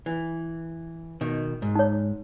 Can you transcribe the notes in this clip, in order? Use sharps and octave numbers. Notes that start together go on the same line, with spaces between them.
E3
B2 D#3
G#2
D#4 C#5